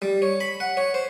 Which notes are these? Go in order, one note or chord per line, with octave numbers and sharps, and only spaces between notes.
G3
C#5
B5
F#5
C#5
C5